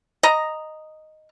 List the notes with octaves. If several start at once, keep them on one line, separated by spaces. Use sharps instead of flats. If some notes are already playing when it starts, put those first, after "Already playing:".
D#5 A#5